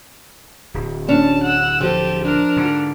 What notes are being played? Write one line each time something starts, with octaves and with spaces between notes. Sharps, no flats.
D1
C#4 D4 A5
F#5 E6
F3 G4 A4
D4 A#4
G#2 D3